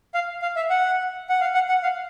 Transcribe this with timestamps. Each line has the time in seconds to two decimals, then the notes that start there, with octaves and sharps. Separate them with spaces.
0.14 F5
0.42 F5
0.56 E5
0.70 F#5
1.29 F#5
1.41 F5
1.54 F#5
1.69 F#5
1.83 F5